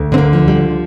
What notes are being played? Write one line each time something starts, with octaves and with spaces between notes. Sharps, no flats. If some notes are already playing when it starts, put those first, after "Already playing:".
Already playing: D2
D3 C4
A#3
F3
G3
D2